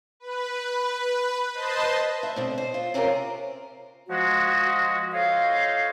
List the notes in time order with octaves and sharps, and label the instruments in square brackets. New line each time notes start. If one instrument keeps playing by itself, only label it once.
[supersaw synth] B4
B4 C5 D#5 A5 C6
[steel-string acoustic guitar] E5
B2 D3 C4
C5
F4
C3 C4 C#4 F4 G4 A#4
[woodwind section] F3 G#3 F#4
F4 A4 C5 C#5 D#5 F5